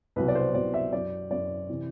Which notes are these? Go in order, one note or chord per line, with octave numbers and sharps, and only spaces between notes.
C2 B2 F#3 B4
D5
C5
C2 B2 F#3 D5
E5
F#2 F#3 D5
F#2 F#3 D5
C3 E3